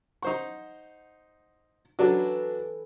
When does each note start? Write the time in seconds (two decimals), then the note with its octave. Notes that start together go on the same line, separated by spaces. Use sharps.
0.22 D#4 C5 F#5 C#6
1.99 E3 F#3 D4 F#4 A4 B4